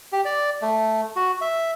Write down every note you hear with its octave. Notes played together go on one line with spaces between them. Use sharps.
G4
D5
A3
F#4
E5